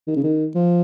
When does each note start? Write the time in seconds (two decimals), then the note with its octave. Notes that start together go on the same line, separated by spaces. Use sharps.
0.07 D#3
0.16 C#3
0.24 D#3
0.55 F3